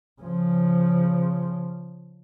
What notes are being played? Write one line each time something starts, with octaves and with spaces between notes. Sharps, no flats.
C#3 F3